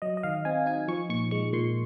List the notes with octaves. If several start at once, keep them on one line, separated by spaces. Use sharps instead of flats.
F#3 D#5
D#5
D#3 F5
C4 G#5
D#4 G#5
F3 C#6
A#2 C#6
G#3 C#6
A#2 C6